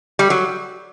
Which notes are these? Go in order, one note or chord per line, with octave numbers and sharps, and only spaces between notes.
G3
F#3